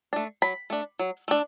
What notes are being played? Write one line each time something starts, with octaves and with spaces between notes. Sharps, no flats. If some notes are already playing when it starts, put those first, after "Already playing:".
A3 D4
F#3 B5
A3 D4
F#3
A3 D4